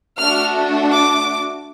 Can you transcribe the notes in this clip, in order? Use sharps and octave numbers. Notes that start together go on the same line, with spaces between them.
A3 D4 F#4 F6
D6